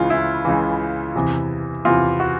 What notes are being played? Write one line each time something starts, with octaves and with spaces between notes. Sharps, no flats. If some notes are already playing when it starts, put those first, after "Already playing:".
Already playing: C#2 C#3 E3 F4
E4
C#2 C#3 E3
E2 C3 E3
E2 C3 E3 F4
F#4